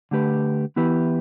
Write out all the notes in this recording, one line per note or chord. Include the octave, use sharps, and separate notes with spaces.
D3 A3 G4 B4
E3 B3 E4 G4 B4